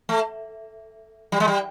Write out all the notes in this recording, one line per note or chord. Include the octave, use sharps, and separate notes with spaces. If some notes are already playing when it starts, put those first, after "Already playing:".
A3
G3
G#3
G3